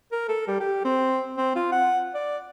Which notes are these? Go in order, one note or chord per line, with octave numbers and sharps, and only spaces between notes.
A#4
A4
G3
G4
C4
C4
F4
F#5
D5